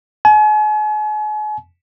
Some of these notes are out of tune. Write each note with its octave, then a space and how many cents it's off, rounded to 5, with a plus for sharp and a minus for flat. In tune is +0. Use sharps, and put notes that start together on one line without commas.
G#5 +40